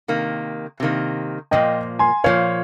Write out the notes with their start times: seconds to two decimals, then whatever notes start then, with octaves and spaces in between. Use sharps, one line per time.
0.08 C3 D#3 A#3
0.80 C3 D#3 A#3
1.51 A#2 F3 A#3 D#5 G5
1.99 G#5 C6
2.24 A#2 F3 A#3 C#5 F5